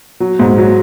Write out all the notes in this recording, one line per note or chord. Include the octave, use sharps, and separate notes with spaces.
F#3
G#2
F#3